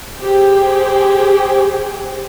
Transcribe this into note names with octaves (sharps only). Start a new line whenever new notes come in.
G4 G#4 C5 G5